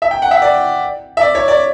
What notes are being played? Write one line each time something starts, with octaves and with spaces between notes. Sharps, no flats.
E5
G5
F#5
E5
D5
E5
D5
C#5
D5